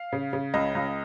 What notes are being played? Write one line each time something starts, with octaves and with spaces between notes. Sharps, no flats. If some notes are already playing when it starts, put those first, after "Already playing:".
Already playing: F5
C#3
C#3
C#2 D#5
C#2